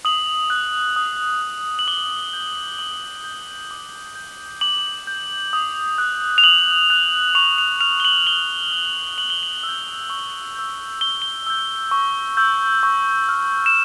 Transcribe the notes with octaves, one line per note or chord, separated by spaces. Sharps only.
D#6 F#7
F#6
D#6
F#6
F#7
D6 G7
G6
D6 F#7
G6
D6
G6
D6 F#7
G6
D#6
F#6
F7
D#6 F#7
F#6
C#6 F7
F7
F6 F7
G7
F#7
C#6 G7
F6
C#6 F#7
G7
F#7
E6 G6
C#6
E6 G6
C#6 G7
G7
E6 G6
C#6
E6 G6
C#6
F6
E7